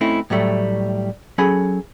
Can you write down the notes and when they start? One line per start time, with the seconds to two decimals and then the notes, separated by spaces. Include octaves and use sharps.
0.01 A3 C4 C#4 D#4 E4
0.30 A2 F#3 G3 A3
1.38 F#3 C#4 G#4 A4 B5